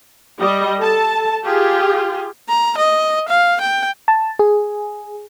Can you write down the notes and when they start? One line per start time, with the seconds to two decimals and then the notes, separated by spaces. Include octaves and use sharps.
0.39 G3 D#5
0.79 A4 A5
1.43 F4 G4 G#4
2.49 A#5
2.77 D#5
3.28 F5
3.60 G5
4.08 A5
4.39 G#4